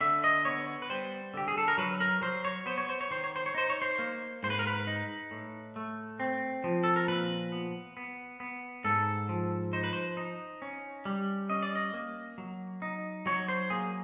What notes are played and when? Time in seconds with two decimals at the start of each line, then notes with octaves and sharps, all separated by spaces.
0.01 D3 E5
0.24 D#5
0.45 B3 C#5
0.82 B4
0.90 G3 C5
1.34 D3 G4
1.48 G#4
1.58 A4
1.68 A#4
1.78 F#3 B4
2.00 A#4
2.22 F#3 C5
2.45 C#5
2.66 B3 C5
2.78 C#5
2.89 C5
3.01 C#5
3.11 D#3 C5
3.24 C#5
3.36 C5
3.46 C#5
3.55 D#4 C5
3.70 C#5
3.82 C5
3.99 A#3
4.43 G#2 C5
4.50 B4
4.59 A#4
4.67 B4
4.87 D#4
5.31 A2
5.76 A3
6.20 C4
6.64 F3
6.84 A4
6.96 A#4
7.07 A#2 B4
7.52 B3
7.97 B3
8.40 B3
8.84 G#2 A4
9.29 F3
9.73 D#4 C5
9.84 B4
9.93 C5
10.17 D#4
10.62 C#4
11.05 G3
11.50 C#4 D#5
11.62 D5
11.75 D#5
11.93 A#3
12.38 F#3
12.82 D#4
13.26 F#3 C#5
13.49 C5
13.70 A#3 G#4